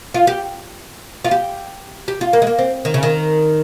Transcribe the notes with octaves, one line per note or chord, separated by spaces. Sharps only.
F4
G4
F4
G4
G4
F4
A#3
G#3
A#3
C4
D#3
C#3
D#3